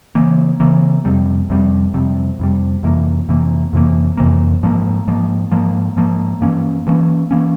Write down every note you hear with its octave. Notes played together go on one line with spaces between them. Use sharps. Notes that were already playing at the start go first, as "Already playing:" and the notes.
C#3 E3 A#3
C#3 E3 A#3
F2 C3 G3
F2 C3 G3
F2 C3 G3
F2 C3 G3
F2 C3 E3 A#3
F2 C3 E3 A#3
F2 C3 E3 A#3
F2 C3 E3 A#3
G#2 F3 A#3
G#2 F3 A#3
G#2 F3 A#3
G#2 F3 A#3
G2 E3 A#3 C#4
G2 E3 A#3 C#4
E3 A#3 C#4